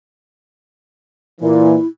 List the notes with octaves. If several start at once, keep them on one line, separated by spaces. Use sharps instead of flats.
A#2 E3 E4